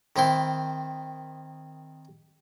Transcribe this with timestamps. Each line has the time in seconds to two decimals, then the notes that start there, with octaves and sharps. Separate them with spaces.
0.16 D#3 C4 E4 C6